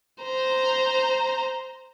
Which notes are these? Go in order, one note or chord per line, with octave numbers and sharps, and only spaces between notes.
C5 A#5